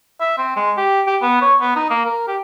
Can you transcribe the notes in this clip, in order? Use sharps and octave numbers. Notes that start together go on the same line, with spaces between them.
E5
C4
G#3
G4
G4
B3
C#5
B3
D#4
A#3
A#4
G4